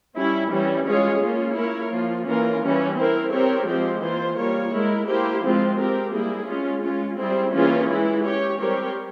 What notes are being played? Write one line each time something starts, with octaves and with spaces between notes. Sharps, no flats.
G3 C#4 E4
E3 G3 C#4
G#3 C#4 F4 G#4 C#5
A#3 C#4 F4
A#3 E4 A#4 C#5
F3 A#3 F4
E3 A#3 C#4 F4 A#4
E3 G3 C#4
C4 E4 A#4
C4 G4 A#4 C#5
F3 G#3 C4 G4 C5
E3 A#3 F4 C5
G3 A#3 F4 A#4 C#5
G#3 E4 A#4
A#3 E4 G4 C5
F3 G#3 C4 F4
C4 G4 A#4
G3 A#3 E4 G#4
G#3 C#4 F4
G#3 C#4 F4
G3 C4 E4 G#4
E3 A#3 C#4 F4 G#4
E3 G#3 E4
C#4 G4 C#5
G3 C4 G4 A#4 C#5